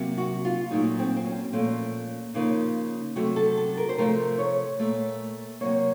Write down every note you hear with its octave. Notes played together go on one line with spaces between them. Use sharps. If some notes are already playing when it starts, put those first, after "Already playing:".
Already playing: C3 F#3 A#3
F#4
F4
A#2 F#3 A3 D#4
C4
C4
C#4
A#2 F3 A3 C#4
C#3 F3 A#3 D#4
C3 F#3 A3 F#4
A4
A4
A#4
C5
C3 F3 A3 A#4
C#5
A#2 A3
C3 F#3 A#3 C#5